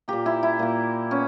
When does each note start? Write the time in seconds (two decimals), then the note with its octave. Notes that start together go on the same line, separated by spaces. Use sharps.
0.08 A#2 A#3 G4
0.26 E4
0.43 E4
0.59 A#2 A#3
1.11 B3 C#4